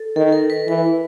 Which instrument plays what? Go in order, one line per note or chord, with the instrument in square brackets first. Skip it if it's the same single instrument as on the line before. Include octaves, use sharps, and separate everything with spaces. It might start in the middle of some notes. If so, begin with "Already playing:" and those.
Already playing: [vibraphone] A4
[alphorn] D#3 [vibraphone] A4
[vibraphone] A#4
B4
[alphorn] E3 [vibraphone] B4